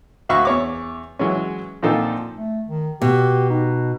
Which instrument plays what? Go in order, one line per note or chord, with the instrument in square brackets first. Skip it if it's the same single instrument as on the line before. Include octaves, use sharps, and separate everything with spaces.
[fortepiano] D2 F#4 E5 F5 B5 C#6
E2 C#5 D6
E3 F#3 G#3 C#4
A#2 D3 F3 C4 D#4 A4
[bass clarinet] A3
D#3
[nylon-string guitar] B2 [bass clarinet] G4
[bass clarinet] D#4